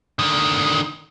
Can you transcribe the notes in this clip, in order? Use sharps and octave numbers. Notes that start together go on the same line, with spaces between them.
D3 D#3